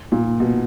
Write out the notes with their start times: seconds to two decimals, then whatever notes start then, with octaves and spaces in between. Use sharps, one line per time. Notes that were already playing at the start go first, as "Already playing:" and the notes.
0.12 A#2
0.40 B2